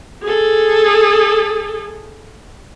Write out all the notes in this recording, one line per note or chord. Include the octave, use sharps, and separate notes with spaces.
G#4 A4